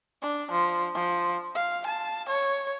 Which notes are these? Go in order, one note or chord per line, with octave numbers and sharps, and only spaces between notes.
D4
F3
F3
F5
A5
C#5